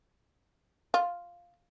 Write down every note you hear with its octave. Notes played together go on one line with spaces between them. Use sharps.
F4